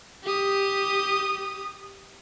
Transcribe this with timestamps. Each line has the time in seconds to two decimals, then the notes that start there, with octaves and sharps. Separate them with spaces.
0.24 G4 D#6